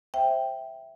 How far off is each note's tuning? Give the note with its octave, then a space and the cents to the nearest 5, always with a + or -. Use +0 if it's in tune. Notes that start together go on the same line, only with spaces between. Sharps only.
C5 +20 E5 +0 G5 +0